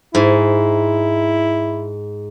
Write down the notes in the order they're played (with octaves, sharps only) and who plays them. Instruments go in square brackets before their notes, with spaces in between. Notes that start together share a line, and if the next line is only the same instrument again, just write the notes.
[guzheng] G#2 [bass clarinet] E4